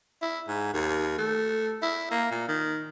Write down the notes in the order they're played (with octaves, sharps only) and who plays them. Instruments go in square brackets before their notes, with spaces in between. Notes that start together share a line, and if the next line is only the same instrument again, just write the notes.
[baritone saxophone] E4
G#2
D#2
A3
E4
A#3
A#2
D#3